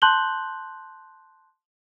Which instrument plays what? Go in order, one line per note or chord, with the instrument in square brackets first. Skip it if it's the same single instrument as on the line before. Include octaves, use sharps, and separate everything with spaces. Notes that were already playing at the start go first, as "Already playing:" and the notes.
[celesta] A5 C6 F#6 G6 F#7 G7